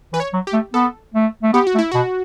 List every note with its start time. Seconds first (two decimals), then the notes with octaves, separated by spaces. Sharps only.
0.13 E3 B4
0.20 C#5
0.33 F#3
0.47 G4
0.53 A3
0.74 B3 A4
1.14 A3
1.43 A3
1.53 B3 G4
1.67 F#4
1.75 A3
1.79 E4
1.92 B2 F#4